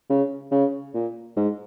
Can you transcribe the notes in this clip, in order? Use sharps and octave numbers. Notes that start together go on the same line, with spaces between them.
C#3
C#3
A#2
G#2